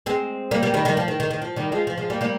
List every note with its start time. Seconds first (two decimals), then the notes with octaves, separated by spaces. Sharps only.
0.06 G#3 C4
0.51 G3 A#3
0.63 G3 A#3
0.74 D#3 G3
0.85 D#3 G3
0.97 F3
1.08 D#3
1.20 D#3
1.30 D#3
1.42 F3
1.56 D#3 G3
1.72 F3 G#3
1.87 F3
1.98 F3 G#3
2.10 G3 A#3
2.21 G3 A#3